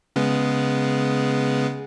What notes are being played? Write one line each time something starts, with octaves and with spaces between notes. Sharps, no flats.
C#3 G#3 B3